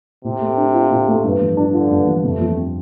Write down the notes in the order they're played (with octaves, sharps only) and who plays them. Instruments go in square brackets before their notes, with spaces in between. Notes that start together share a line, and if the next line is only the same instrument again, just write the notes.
[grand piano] A2 [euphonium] C3
[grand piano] A3
D4
F4
A2
A3
G2
F3
D4
[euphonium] D3 [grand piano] F4
[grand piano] G2
F3
[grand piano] F2 [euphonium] A3
[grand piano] F3
C4